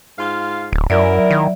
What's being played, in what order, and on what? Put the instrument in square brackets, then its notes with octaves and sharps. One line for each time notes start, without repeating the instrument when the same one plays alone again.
[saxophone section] G#2 F4 F5
[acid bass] D1
[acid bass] F#2 [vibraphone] F#3 D5 E5 [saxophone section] E4 A#4
[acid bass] D#3